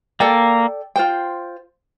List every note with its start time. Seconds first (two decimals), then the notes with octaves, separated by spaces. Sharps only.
0.20 A#3 A4 D5 G5
0.96 F4 C5 G5